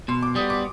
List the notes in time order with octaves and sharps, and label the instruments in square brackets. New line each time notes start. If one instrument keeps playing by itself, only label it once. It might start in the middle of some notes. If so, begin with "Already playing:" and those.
[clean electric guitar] B2 [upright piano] C6
[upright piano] D6
[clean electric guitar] G3 B3 [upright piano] D#6
[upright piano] D6